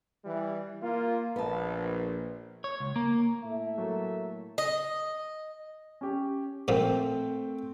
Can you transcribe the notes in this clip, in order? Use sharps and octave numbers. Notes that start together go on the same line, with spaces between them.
E3 G3
A#3 F4
A#1 B3 A5
C#5
C#2
A#3
A2 A4 E5
F#3 A3 A#3
D#5
C#4 G4
A#2 F3 A3 C4 G5